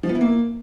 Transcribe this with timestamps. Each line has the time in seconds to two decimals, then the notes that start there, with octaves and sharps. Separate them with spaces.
0.03 F3
0.09 B3
0.15 E4
0.21 A#3